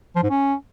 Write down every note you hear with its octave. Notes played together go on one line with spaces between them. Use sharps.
F3
G#2
C#4